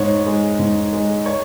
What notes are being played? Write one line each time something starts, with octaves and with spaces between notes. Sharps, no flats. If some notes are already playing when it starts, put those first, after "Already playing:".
Already playing: G#2 C#5
G#3
G#2
G#3
C#5